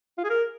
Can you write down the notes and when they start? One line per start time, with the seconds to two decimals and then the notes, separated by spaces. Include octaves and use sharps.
0.18 F4
0.24 G#4
0.30 A#4